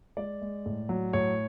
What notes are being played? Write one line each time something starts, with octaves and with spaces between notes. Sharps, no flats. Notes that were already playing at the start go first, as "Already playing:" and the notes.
G#3 D5
G#3
A2
F#3
A2 C#5